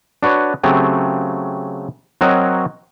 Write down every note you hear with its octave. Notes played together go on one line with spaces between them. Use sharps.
D4 F#4 B4 C#5
C#3 F#3 A3 C4 G4
F#3 C4 F#4 A#4 C#5 D#5